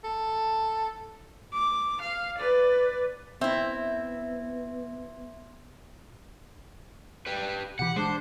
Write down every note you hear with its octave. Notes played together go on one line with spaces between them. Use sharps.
A4
D6
F5
B4 D5
B3 C4 E4 E5
G4 B4
B2 E3 G4 F#5
G#3 D4 C5